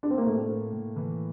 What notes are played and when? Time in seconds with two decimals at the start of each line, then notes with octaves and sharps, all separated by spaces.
0.03 D4
0.11 C4
0.18 A#3
0.26 A2 A3
0.50 A#3
0.72 A2
0.96 E3